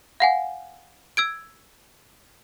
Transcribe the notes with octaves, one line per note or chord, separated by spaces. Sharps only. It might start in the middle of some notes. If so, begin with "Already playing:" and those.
F5 F#5 G#5
E6 G#6 D7